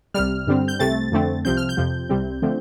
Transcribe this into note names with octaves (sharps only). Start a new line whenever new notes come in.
C2 C3 G3 F6
G2 D3 G3 C4
G6
C2 C3 A3 C4 A6
F2 D3 A3 C4
C2 C3 F3 C4 G6
F6
G6
F2 C3 F3
C2 C3 G3 C4
D3 F3 A3 C4